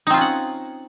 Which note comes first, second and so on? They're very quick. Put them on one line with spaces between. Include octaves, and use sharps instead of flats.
D#4 C4 F4 C#4 F#5